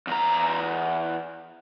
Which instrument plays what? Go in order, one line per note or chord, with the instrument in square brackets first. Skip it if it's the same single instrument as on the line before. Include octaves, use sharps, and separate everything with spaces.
[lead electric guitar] E2 A#5